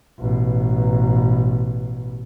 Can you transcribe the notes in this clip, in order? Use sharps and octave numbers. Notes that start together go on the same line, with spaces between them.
A1 B2